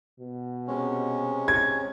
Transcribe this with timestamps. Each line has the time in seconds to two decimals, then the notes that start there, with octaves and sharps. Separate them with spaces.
0.20 B2
0.68 C3 G#3 C#4
1.48 G#6